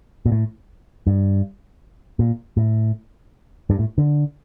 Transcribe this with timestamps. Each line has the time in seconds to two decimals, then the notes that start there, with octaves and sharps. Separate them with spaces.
0.26 A#2
0.32 A2
1.07 G2
2.19 A#2
2.57 A2
3.70 G2
3.79 A2
3.98 D3